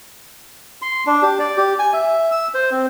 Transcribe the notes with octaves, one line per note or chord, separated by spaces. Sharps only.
C6
D4
G4
D5
G4
G#5
E5
E6
C5
C4